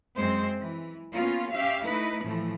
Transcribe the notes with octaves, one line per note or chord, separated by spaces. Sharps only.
F#2 G#3 C4 C5
E3
A#3 B3 C#4 F4
C#4 G4 E5 F5
A3 D#4 E4 B4
A2 E3 F3 A3